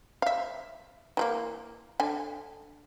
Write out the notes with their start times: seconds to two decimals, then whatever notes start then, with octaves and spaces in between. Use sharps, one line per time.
0.22 E5 F5
1.17 E3 A3 A#3
2.00 D3 G#5